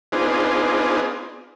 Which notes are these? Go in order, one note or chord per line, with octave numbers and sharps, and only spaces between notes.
B3 C4 D4 D#4 F4 G#4